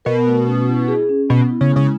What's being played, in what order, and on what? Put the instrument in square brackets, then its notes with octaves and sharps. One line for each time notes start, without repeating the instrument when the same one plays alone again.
[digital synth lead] B2 [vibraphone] A#4
[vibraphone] A3
C#4
E4
G#4
C#4
[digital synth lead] B2 [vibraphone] B3
[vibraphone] E4
[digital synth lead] C#3
[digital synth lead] C#3 [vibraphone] G#3